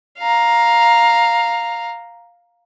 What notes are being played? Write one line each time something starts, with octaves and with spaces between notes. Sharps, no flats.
F5 A#5